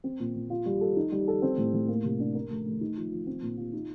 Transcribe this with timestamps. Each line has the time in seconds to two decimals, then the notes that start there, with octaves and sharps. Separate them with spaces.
0.04 C4
0.20 A#2
0.35 A#2
0.50 F4
0.66 G3
0.81 A4
0.97 D#4
1.12 G3
1.28 A4
1.42 C4
1.57 A2
1.74 A2
1.88 A#3
2.04 C3
2.20 D4
2.35 A#4
2.50 A3
2.66 A3
2.81 D#4
2.97 F3
3.11 F3
3.27 C4
3.42 A#2
3.57 F4
3.73 D#4